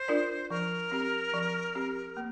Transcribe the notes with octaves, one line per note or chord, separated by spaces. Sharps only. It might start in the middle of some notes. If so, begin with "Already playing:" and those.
Already playing: C5
D4 F4 A#4 D5
F3 A#4
C4 G4
F3
C4 G4
A#3